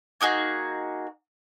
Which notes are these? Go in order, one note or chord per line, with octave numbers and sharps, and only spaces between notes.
A#3 D#4 F#4 G#4